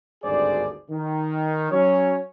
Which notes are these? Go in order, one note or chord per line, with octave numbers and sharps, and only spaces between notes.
G#1 D2 G2 G#4 C5 D5
D#3
F#3 C#4 C#5